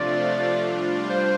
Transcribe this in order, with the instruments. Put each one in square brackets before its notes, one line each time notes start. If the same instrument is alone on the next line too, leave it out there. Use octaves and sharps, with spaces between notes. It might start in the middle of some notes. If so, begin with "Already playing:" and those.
Already playing: [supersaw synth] C3 F3 A3 D4 F4 [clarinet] D5
[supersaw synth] G3 D4 F4
[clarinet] C5